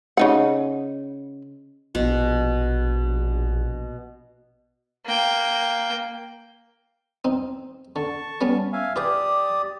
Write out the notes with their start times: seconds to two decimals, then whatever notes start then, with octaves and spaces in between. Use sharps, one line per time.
0.17 C#3 D#4 F#5
1.95 A#1 B2
5.06 A#3 G5
7.25 C4 D#4
7.96 D3 A5 C#6
8.41 G3 B3 C#4
8.73 E5 F5 G#5
8.96 F4 G4 B4 D5 G5 D#6